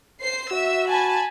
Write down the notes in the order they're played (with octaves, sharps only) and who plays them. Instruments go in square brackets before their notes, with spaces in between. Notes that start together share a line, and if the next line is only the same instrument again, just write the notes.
[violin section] C5 C7
[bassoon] F#4 [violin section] E5 E6
[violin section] G#5 A5 B5